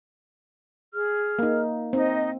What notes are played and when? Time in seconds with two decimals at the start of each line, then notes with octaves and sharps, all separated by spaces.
0.93 G#4 F6
1.39 A#3 D#4
1.93 C4 D#4 D#5